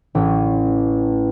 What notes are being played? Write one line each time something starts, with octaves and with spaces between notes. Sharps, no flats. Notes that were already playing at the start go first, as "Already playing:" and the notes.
A1 C#4